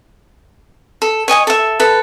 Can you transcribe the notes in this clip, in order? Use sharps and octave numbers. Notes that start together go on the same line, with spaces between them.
A4
C#5 D#5 G#5 D#6
A4 E5
A4 B4